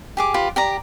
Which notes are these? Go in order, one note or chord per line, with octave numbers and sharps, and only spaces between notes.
G4 G#4 D6
F4 G4 B4
G4 D5 A#5